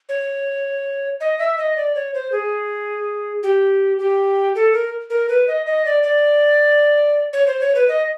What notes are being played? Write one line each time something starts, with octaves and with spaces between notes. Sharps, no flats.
C#5
D#5
E5
D#5
D5
C#5
C5
G#4
G4
G4
A4
A#4
A#4
B4
D#5
D#5
D5
D5
C#5
C5
C#5
B4
D#5